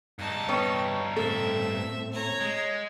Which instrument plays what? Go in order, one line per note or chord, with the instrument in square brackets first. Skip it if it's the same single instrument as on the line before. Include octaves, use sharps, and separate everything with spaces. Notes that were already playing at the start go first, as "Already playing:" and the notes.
[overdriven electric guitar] G2 D#4 [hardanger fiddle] A5
[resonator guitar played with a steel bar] G3 B3 C#5
[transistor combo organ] A2 A3 C4 [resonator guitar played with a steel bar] A4 [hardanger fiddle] E5
[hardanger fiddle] C#5 A#5
[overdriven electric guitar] G#3